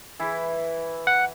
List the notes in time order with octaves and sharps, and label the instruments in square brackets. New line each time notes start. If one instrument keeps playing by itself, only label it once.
[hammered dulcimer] E3 E4
[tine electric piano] F#5